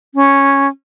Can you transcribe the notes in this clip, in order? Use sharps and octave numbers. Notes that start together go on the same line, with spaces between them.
C#4